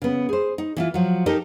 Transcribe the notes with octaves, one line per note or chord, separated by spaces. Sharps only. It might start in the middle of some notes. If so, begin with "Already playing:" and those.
C#3 B3
G#4 C5
D#4
E3 E4 F4
F3 F#3
D#4 G4 A4 A#4 D#5